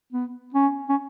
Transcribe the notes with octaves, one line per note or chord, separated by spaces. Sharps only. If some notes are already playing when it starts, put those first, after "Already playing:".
B3
C#4
C#4